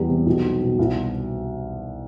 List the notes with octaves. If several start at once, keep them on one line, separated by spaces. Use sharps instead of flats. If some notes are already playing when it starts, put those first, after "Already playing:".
Already playing: E2 G3
C3
B1
G3
B2
C2